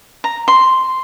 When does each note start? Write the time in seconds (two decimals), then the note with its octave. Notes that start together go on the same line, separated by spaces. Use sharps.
0.24 A#5
0.48 C6